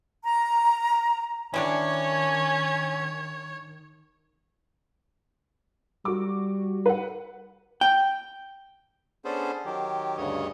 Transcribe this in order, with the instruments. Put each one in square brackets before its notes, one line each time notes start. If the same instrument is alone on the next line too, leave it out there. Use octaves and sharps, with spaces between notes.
[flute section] A#5
[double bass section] D#3 [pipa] E3 G3 D4 [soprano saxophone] C#4 [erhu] C#5
[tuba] G3 [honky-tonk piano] F#4 D6
[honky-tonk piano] B4 F#5
[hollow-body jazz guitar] G5
[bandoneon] B3 C#4 D4 G#4 A4 C5
D#3 F#3 G4
D2 G2 C#3 C#5 D#5